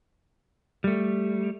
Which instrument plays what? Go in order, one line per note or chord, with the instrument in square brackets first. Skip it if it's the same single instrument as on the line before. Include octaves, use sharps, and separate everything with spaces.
[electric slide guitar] G3 A3